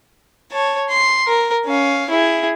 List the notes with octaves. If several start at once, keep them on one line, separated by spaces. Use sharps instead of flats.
C#5 A5
C6
A#4
C#4 F5
E4 G#4